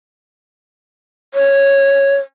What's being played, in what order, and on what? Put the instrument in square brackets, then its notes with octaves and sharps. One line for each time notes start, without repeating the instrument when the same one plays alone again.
[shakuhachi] C#5